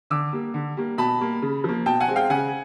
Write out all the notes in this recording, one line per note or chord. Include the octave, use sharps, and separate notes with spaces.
D3 D6 E6
G3 A#3
D3
G3 A#3
B2 A5 B5
G3 A#3
C#3
F3 A#3
B2 G5 A5
F#5 G#5
G#3 C4
F5 G5
C#3 F#5 G#5